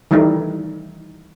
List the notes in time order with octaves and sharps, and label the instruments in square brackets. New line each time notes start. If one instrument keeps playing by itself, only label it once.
[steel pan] D#3 E3 G3 A3 D#4